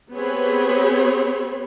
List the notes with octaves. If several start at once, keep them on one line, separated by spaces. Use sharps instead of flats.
B3 C4 G4 G#4 C#5 B5